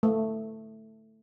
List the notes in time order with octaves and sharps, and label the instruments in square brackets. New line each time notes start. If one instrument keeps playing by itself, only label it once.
[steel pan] A3